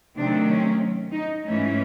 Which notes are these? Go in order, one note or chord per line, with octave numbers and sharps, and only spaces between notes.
C3 D#3 F#3 A3 C4 D4
C#4
D#4
G#2 E3 A3 C#4